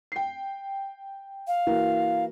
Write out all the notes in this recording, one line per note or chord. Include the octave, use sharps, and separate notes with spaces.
G5 C7
F5
E3 A#3 F#4